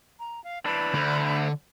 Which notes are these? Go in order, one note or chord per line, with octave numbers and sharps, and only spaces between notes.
A#5
F5
E3 D4 B5
D2 D3